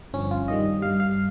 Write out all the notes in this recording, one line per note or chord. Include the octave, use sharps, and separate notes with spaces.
G1 G2 F3 C#4
F4
G2 D#3 G3 D#5
G2 G3 F5
F5